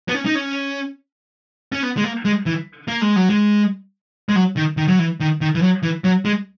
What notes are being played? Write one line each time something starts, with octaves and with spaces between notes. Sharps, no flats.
B3
C#4
D#4
C#4
C#4
B3
G#3
A#3
G#3
E3
A#3
G#3
F#3
G#3
G#3
F#3
D#3
D#3
F#3
E3
D#3
D#3
E3
F#3
E3
F#3
G#3